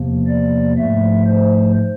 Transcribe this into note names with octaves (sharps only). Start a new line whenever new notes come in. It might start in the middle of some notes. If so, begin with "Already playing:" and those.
Already playing: E2 C3 F3 A#3
D5
G#2 F3 A3 E5
C5